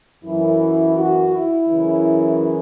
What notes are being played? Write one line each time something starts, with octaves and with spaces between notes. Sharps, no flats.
F#2 E3 E4
F#4
E4
F#2 C#3 E3